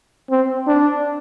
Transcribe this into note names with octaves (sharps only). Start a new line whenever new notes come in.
C4
D4